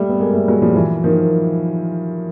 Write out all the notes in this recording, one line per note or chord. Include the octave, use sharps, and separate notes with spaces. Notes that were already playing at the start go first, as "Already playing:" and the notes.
Already playing: G3 A3
B3
G#3 A#3
G3 A3
F#3 G#3
F3 G3
E3 F#3
D#3 F3